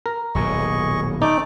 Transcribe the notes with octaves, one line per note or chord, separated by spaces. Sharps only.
A#4
D#1 B1 A2 G#4 D#5 C#6
A3 D#4 D5 D6